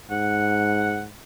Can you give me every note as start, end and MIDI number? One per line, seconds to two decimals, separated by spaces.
0.10 1.12 44
0.10 1.01 78